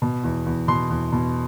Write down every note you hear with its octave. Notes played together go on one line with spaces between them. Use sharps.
B2
E2
E2
B2 C6
E2
B2